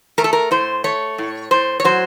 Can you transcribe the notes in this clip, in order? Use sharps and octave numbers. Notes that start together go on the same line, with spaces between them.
A3 A#4
A4
A#4
A2 C5
A3 C#5
A2
A2 C5
C#5
F#3 C5